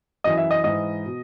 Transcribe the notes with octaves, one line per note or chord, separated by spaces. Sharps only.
F#2 E3 D#5
E5
D#5
G#2 E3 D#5
B2